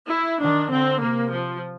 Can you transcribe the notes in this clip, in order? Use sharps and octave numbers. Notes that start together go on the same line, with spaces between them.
E4
D#3 D4
D3 C4
C3 A#3
F3